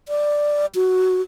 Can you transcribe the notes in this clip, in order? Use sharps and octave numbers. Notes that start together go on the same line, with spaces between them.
D5
F#4